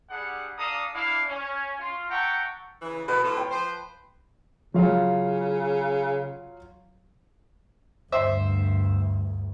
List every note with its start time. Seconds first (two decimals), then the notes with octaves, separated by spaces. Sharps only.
0.10 G3 D4 G#4 F#5
0.59 D4 A4 F5 A#5 D#6
0.94 D4 E4 F5
1.27 C#4
1.80 F4
2.09 E5 F#5 G5 A5 A#5 C#6
2.82 C#3 E3
3.08 B2 B4
3.24 A2 F4 A4
3.37 G5
3.51 F3 C5
4.74 C#3 F#3 F4 F5
8.12 D2 G2 C5 E5